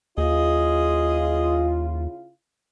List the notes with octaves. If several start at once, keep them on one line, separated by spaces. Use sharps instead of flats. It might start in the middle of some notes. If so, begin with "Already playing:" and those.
D#2 C#3 E4 F4 G#4 D#5